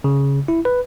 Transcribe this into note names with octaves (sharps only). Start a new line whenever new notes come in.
C#3
E4
B4